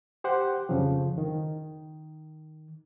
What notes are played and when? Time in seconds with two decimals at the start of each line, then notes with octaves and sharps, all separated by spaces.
0.24 G4 C5 F#5 G5
0.69 F2 C#3 F3
1.18 D#3